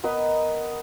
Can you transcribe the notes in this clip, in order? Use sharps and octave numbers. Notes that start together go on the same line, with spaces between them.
B3 A#4 B4 D#5